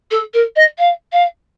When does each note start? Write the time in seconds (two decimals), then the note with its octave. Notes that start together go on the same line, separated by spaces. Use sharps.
0.11 A4
0.33 A#4
0.55 D#5
0.78 F5
1.12 F5